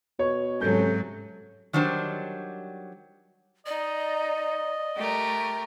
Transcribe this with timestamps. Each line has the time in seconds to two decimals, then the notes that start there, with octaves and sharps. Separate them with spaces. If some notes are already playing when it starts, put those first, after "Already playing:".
0.19 B2 C#5
0.61 G#2 C3 F#3 C#4 A4 G6
1.73 D#3 F#3 G3 D4 C5
3.66 D#4 D5 D#5
4.95 A3 G4 A#4